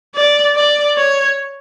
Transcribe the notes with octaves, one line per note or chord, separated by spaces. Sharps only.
D5
D5
C#5